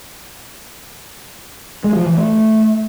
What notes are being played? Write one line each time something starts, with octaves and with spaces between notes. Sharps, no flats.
G#3
F3
E3
A3